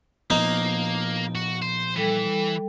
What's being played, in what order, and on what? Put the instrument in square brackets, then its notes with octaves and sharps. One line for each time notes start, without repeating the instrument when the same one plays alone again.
[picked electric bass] A#2 F3 B3 [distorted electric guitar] A#3 [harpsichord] D#4
[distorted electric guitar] F#4
C5
[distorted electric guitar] E3 [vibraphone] G3 A4 G5